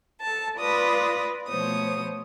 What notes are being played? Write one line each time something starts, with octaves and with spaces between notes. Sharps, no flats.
A4 A5
F4 B4 D5 D#6 A#6
B2 F3 A3 C5 C#5 D#6